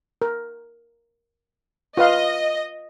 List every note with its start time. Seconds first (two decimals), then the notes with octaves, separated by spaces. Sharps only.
0.22 A#4
1.97 F4 B4 D#5 F5